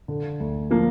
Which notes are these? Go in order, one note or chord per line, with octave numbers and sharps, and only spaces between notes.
D3
D2
F3 A#3